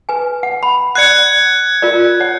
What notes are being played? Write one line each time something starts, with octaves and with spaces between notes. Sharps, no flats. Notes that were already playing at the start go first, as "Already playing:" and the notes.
B4 G#5
F#5
B5
D5 F#5 F#6 G#6 C#7
F4 A#4 D5
C#5 F#5